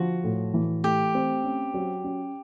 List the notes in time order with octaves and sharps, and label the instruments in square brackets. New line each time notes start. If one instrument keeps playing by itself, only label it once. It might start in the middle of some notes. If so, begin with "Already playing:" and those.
Already playing: [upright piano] D3 F3 [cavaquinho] F#4
[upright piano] A2
E3
[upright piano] A3 [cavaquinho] G4
[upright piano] C4
C#4
F#3
C#4